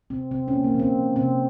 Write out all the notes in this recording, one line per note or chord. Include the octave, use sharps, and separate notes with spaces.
C3 C4
C3 C4
C#4
A#3
A#3
F3
C4
F3
C3 C4